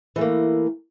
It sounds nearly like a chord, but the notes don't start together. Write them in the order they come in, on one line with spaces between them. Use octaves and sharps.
E3 A3 A#3